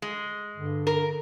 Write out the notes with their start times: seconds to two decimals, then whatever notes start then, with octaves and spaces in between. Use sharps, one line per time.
0.02 G#3
0.57 G2 D3
0.87 A#4